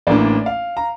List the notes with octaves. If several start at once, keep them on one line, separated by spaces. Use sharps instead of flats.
A1 A2 E3 A#3 D4 D5
F5
A#5